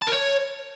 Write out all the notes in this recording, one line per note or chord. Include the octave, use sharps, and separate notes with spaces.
A5
A#4
C#5